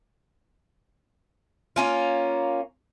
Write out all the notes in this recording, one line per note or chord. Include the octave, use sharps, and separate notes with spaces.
A#3 C#4 F4